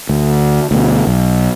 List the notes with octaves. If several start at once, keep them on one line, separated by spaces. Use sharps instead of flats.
D2
D2 B2
B1